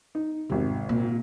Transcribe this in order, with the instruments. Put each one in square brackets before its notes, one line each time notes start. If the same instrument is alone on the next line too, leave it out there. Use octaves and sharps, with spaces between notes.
[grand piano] D#4
[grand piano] G#1 C3 [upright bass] G#2
[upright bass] A#2